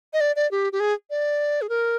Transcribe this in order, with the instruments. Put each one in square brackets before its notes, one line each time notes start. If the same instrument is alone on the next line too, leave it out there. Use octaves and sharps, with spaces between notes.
[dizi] D#5
D5
D5
G4
G4
G#4
D5
G#4
A#4